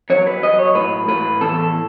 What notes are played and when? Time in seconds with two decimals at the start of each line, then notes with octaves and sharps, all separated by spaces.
0.10 F#3 C#5
0.27 B4
0.43 F#3 D#5
0.59 C#5
0.75 A2 B4
1.08 A2 B4
1.41 E2 A4